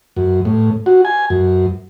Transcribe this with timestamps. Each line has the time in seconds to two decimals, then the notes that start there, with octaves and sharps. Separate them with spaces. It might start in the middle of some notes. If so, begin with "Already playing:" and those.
0.16 F#2
0.45 A2
0.86 F#4
1.05 G#5
1.30 F#2